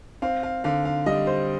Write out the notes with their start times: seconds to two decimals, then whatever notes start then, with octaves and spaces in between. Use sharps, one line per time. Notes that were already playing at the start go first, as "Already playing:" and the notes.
0.22 C4 F5
0.43 F5
0.64 D3 F5
0.85 F5
1.06 G3 D#5
1.27 C5